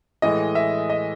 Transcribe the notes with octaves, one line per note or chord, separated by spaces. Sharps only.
A2 E3 G#3 D#5
E5
D#5